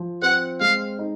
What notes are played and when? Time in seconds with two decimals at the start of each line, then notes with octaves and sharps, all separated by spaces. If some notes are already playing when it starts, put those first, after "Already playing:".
Already playing: F3
0.22 C4 F#5
0.61 G#3 F5
0.99 D#4